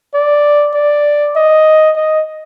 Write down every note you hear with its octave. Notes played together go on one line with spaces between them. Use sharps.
D5
D5
D#5
D#5